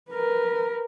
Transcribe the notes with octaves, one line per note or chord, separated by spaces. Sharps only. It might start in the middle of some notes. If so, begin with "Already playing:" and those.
A#4 B4